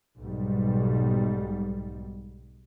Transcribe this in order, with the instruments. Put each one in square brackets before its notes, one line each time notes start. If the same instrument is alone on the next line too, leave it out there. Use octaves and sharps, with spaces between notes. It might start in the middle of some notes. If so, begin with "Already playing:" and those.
[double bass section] B1 G#2 G3